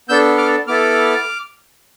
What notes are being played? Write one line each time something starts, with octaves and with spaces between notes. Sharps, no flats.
B3 D4 A4 E6 G6
D6 F6
B3 E4 A4 D6 F6